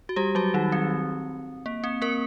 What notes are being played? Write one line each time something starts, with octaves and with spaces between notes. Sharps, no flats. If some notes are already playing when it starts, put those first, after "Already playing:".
F#4
G3 G4
F#3 F#4
D#3 D#4
C4
A#3
C4
A#3 A#4